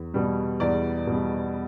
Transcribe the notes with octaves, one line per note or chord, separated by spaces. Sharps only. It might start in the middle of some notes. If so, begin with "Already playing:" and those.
Already playing: E2
B2 G3
E2 D5
B2 G3